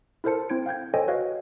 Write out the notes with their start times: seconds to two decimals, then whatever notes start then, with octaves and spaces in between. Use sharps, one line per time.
0.24 E4 A4 A#4 C5 A5 C#7
0.49 C4 E4 C5 G#6 D7
0.66 F5 G5 G6 G#6
0.94 A4 C5 C#5 D#5 G5 G#5
1.08 F#4 B4 C#5 D#5 F5